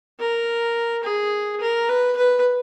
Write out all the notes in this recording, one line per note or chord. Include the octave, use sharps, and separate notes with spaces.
A#4
G#4
A#4
B4
B4